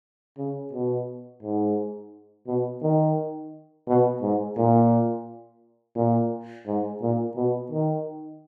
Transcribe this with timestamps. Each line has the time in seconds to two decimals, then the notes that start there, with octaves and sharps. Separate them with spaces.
0.38 C#3
0.73 B2
1.43 G#2
2.47 B2
2.82 D#3
3.87 B2
4.22 G#2
4.57 A#2
5.96 A#2
6.67 G#2
7.02 A#2
7.36 B2
7.72 D#3